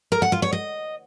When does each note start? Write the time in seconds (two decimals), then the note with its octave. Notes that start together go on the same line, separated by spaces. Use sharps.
0.12 A#4
0.22 F#5
0.32 F4
0.42 C#5
0.53 D#5